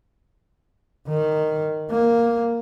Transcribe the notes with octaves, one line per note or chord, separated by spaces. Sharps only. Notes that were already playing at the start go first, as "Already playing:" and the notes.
D#3
A#3